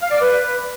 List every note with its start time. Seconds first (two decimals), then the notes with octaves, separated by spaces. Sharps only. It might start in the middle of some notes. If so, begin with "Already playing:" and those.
0.01 F5
0.10 D5
0.20 B4